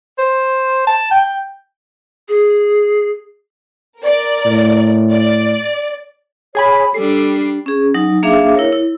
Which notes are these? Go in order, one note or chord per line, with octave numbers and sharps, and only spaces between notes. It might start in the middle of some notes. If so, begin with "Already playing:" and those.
C5
A5
G5
G#4
A#4 D5
A2
D5
G#4 C#5 G#5 B5
G3 D4 A4 C7
C#4 G#4
F#3 D#4
A#3 D4 G#4 E5 F5 D6
E4 A#4 C#5
E4